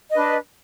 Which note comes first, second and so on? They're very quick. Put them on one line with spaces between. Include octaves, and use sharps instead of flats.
D#5 B4 D4